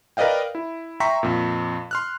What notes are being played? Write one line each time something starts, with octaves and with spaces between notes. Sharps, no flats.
A#4 B4 D5 D#5 F5 G5
E4
E5 G5 A#5 C6 C#6 B6
F2 A#2
C6 F6 F#6